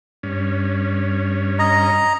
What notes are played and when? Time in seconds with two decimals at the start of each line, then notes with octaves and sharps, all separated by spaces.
0.23 G2 C#4
1.59 D#5 A#5